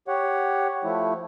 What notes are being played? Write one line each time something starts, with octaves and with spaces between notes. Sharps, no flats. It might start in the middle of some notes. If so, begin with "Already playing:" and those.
G4 C#5 F#5
F3 A3 E4